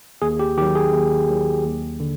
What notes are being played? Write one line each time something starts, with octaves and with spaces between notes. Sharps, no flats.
D#2 G#4
G4
D#3 F#3 G4
G#4
D#2
D#3 F#3
D#2
D3